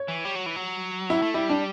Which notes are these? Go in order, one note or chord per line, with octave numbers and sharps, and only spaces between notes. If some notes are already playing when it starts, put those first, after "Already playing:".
Already playing: C#5
E3
G3
F#3
E3
F#3
E4
A3
G3 E4
D4